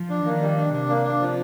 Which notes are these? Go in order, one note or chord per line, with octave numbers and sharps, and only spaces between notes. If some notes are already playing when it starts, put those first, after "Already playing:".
Already playing: F3
D4
D#3 A#3
G3
D4
C3 D4
A#3
D4
F3